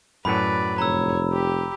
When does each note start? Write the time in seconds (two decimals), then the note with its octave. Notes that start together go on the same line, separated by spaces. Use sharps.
0.25 F#2 A2 F#3 B4 D5 B5
0.78 F1 C#5 A#5 E6
1.32 G4